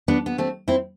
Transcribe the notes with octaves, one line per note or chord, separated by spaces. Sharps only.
B3 D4
B3
A3 C4
C4 E4